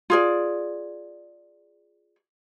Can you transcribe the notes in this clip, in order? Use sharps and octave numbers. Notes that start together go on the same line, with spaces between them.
F4 G#4 D5